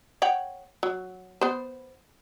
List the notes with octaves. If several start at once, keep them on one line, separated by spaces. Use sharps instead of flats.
C#5 F#5 G5
F#3
B3 C5